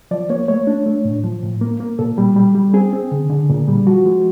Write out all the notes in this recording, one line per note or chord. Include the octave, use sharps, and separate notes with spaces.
F3 D5
A#3 C#5
A3 C#5
D4
A3
A2
F3
A2
A#3
A#3
A#2 A4
G3
G3
G3
C4 G#4
C4
D3
D3
A#2
G3
F3 F#4
G#3